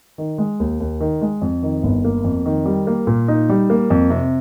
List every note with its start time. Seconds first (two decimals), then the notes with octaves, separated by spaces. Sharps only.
0.18 D#3
0.38 G#3
0.60 D#2
0.80 D#2
1.01 D#3
1.22 G#3
1.42 F2
1.63 D#3
1.83 G1
2.05 A#3
2.24 F2
2.46 D#3
2.66 G3
2.87 A#3
3.07 A#2
3.28 D#4
3.49 G3
3.70 A#3
3.90 F2
4.10 C3